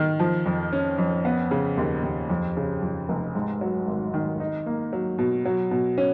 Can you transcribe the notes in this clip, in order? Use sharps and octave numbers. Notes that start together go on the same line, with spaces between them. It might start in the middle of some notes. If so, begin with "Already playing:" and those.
Already playing: D#3
F3
F2
C#4
F2
B3
C#3
D#2
D#2
F2
C#3
F2
F1
G#2
F#3
G#1
D#3
D#4
A#3
F#3
B2
F#3
B2
C#4